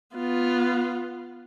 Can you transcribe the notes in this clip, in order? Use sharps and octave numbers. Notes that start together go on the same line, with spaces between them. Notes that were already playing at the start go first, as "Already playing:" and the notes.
B3 F4